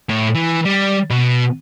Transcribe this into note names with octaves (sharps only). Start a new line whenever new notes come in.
A2
E3
G3
B2